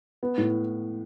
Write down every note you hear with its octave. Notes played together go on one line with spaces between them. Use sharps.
B3
A2